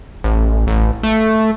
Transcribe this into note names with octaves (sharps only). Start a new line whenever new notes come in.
A1
A1
A3